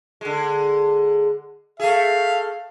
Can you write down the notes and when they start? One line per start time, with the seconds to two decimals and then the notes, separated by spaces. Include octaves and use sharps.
0.21 D3 G#3
1.80 A3 G#4 F5